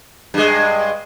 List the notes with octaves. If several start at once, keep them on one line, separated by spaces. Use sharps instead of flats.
G2 G#3